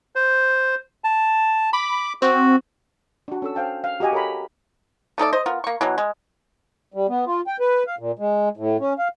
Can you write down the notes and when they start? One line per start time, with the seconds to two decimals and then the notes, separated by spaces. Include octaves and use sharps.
0.15 C5
1.04 A5
1.73 B5 D6
2.22 C4 F#4
3.28 D4 F#4
3.42 C#4 A4 E6
3.55 C5 F5 G5 A5
3.84 F5
4.00 F#4 G4 D#5 G#5
4.12 A4 A#4 C#5 G#5 A#5 B5
5.18 A3 D#4 A4 D5
5.33 C5 D#5
5.46 B3 F4 A#4
5.64 A#3 C#6
5.81 B2 E3 F#3
5.98 G#3
6.94 G3
7.09 B3
7.27 F4
7.47 G5
7.60 B4
7.87 F5
7.99 A#2
8.19 G#3
8.57 A2
8.80 C#4
8.99 F5